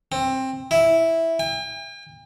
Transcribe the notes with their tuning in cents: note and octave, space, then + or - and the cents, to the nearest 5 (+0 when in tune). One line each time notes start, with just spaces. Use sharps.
C4 +15
E4 -5
G5 +45